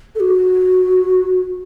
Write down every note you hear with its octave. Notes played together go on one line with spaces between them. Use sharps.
A4
F#4